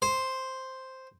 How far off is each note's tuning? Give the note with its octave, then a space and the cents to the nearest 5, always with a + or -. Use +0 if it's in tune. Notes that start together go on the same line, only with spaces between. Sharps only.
C5 +0